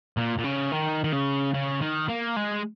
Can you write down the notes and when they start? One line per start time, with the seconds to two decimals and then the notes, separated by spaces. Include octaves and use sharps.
0.17 A#2
0.38 A#2
0.44 C#3
0.72 D#3
1.04 D#3
1.13 C#3
1.54 C#3
1.81 D#3
2.08 A#3
2.36 G#3